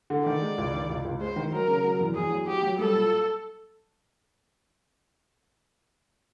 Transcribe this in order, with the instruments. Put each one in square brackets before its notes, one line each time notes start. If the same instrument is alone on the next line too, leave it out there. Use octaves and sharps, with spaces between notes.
[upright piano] D3
[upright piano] D#3 [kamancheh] D5
[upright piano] G#3
C#2
D#3
C#2
C#2
[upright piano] G#3 [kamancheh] C5
[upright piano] D#3
[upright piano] F#3 [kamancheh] A#4
[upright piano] C#3
F#3
E2
[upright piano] E2 [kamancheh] G#4
[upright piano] F#3
[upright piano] F#3 [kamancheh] G4
[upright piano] F#3
[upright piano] G3 [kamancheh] A4
[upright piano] A#2